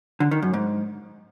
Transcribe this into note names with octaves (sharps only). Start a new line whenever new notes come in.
D3
D#3
F#2
G#2